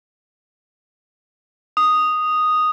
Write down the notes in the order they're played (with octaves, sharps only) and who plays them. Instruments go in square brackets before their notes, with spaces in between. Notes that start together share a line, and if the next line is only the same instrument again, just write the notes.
[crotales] D#6